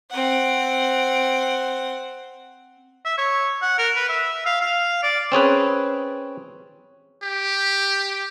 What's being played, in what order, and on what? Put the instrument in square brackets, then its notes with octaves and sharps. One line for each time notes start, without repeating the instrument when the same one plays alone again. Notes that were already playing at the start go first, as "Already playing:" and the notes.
[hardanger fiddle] C4 F#5
[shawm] E5
C#5
F#5
A#4
B4
E5
F5
F5
D5
[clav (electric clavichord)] C4 C#4 G#4 B4
[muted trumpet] G4